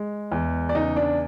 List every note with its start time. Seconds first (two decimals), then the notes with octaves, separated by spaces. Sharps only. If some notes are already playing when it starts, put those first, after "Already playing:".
Already playing: G#3
0.32 E2
0.69 D5
0.75 C#3 D#4 D#5
0.97 D4 D5